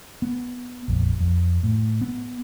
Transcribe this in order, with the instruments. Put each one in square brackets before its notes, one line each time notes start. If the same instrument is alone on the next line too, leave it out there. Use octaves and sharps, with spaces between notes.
[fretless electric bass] B3
A#1 F2
F2
A2
B3